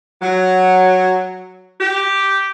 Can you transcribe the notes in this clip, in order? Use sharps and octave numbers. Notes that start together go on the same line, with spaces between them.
F#3
G4